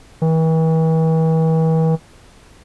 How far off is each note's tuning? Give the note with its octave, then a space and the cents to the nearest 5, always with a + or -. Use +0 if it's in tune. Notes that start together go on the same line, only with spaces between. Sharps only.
E3 -40